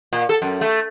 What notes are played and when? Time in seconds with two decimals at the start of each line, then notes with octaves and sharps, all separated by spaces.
0.13 A#2
0.29 A4
0.42 F#2
0.61 A3